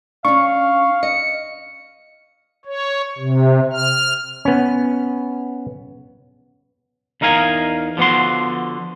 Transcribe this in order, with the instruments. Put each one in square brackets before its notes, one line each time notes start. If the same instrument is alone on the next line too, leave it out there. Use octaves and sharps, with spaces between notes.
[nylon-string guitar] C#4 D4 [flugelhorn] F5 [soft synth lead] C#6
[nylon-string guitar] D#5 [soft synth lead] C#7
[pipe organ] C#5
C3
F6
[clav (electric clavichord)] B3 C#4
[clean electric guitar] E2 D#4 A#4 F5 G#5
D3 F3 B3 F#4 C6